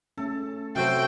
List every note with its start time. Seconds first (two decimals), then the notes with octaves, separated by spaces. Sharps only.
0.18 A3 C#4 A4
0.76 C3 F#3 F#4 A4 C5 E5 G5